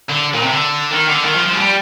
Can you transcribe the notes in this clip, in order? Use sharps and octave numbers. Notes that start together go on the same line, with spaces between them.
D3
A#2
C3
D3
D#3
D3
D#3
F3
F3
G#3
G3